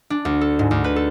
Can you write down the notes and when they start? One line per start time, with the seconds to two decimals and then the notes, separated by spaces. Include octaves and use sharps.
0.10 D4
0.25 D2
0.41 A4
0.59 G#2
0.71 D2
0.84 B4
0.96 A4